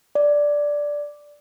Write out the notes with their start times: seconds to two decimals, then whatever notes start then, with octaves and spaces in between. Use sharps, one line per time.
0.15 D5